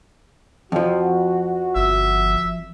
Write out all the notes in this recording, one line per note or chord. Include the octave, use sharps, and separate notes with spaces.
F2 F3 F#4
G1 E5